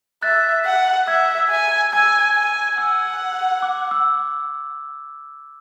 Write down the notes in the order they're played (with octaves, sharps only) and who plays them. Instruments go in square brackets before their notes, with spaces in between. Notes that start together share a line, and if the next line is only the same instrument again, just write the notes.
[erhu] E5 [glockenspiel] F#6 A6
[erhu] F#5
[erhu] E5 [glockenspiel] E6 G#6
[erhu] G#5
[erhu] G#5 [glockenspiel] E6 G#6
[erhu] G#5
[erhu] F#5 [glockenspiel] E6
[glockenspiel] D6
E6